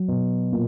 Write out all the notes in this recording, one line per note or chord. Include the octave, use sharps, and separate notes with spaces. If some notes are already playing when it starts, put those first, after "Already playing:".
Already playing: F#3
B2
A#2